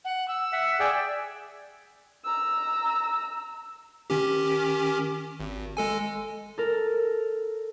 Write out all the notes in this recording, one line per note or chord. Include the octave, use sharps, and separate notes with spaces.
F#5
E6
E5 F#5
G#4 D5 G5
A#5 E6
D#3 C#4 G4
G#1
G#3 A4 G#5
A4 A#4